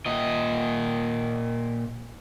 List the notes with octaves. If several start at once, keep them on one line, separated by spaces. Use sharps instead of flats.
A#2 D#5